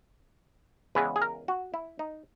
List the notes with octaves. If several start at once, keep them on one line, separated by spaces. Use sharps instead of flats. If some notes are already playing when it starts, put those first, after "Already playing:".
E2 C#3 E3 G#3 B3 B4
G#4
A#4
F#4
E4
D#4